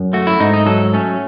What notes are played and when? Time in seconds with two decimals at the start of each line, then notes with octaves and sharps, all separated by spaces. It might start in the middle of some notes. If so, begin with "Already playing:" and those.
Already playing: F#2
0.13 A3 F#4
0.27 E4
0.40 G#2 D#4
0.54 D#4
0.66 F#3 A4
0.93 A3 C#4